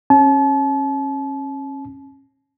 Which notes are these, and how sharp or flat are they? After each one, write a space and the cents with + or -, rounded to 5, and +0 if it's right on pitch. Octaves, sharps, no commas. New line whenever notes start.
C#4 -30 A5 -40